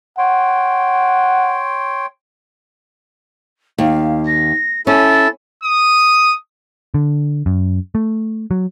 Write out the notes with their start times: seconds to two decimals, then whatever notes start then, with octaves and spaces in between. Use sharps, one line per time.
0.18 C#5 F#5 G5 C6
3.78 D#2 F5
4.26 A#6
4.87 C#4 E4 A4 E5 A6
5.63 D#6
6.94 D3
7.46 F#2
7.95 A3
8.51 F#3